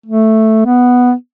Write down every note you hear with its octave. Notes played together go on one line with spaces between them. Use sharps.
A3
B3